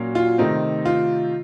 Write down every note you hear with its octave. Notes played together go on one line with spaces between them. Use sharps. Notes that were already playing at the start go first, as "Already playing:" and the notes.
Already playing: A#2 F#3 A#3 C#4
F4
C3 D#3 A3 C4 D#4
F4